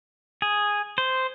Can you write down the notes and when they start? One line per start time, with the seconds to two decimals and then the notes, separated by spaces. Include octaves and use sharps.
0.42 G#4
0.98 C5